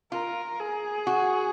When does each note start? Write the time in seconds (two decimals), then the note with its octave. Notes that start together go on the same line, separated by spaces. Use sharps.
0.12 F4 A#4
0.60 G#4
1.07 F#4